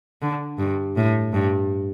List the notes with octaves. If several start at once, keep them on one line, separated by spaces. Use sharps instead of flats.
D3
G2
A2
G2